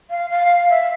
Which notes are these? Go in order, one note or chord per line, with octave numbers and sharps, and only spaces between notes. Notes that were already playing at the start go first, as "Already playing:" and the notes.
F5
F5
E5